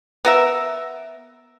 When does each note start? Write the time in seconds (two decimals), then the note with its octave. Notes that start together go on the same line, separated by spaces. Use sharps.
0.25 B3 A#4 E5